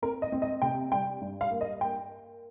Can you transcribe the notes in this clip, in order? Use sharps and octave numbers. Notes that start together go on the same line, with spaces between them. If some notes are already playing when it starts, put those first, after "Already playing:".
C4 A#4
D#5
C4
D#5
C3 G5
G3 G5
G2
F5
A#3
D#5
A#3 G5